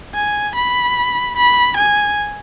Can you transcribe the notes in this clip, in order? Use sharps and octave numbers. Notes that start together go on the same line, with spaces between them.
G#5
B5
B5
G#5